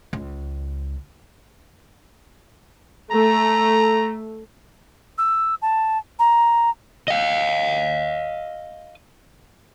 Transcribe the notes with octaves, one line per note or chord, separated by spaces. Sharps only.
C#2
A3 A#5
E6
A5
A#5
D#5 F5